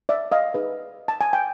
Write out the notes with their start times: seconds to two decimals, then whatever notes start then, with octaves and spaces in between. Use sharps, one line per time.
0.09 D5 E5
0.32 D#5 F5
0.54 D#4 G#4 B4
1.08 A5
1.21 G#5
1.33 G5